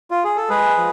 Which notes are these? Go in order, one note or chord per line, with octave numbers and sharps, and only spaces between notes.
F4
G#4
A4
G#3 G#4 B4
F3